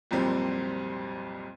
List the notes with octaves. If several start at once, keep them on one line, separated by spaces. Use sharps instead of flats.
C2 F2 A#2 F#3 G3 C4